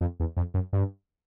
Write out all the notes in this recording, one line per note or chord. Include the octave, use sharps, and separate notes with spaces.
F2
E2
F2
F#2
G2